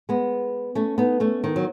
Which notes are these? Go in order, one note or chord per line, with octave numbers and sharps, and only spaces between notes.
G#3 B3
A3 C#4
B3 D#4
A3 C#4
D#3
F#3